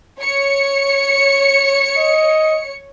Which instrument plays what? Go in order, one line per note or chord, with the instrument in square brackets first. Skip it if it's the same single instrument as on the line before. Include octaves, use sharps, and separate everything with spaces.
[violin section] C#5 C#7
[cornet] D#5